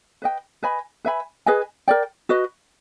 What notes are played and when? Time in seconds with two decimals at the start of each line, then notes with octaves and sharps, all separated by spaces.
0.22 B4 D#5 G5
0.63 B4 D#5 G#5 B5
1.05 B4 E5 G#5 B5
1.46 G#4 B4 D#5 G#5
1.88 A#4 D5 G5
2.29 F#4 B4 D#5